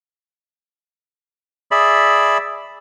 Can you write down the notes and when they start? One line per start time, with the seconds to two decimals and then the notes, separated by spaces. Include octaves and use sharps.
1.71 G#4 D5 E5 B5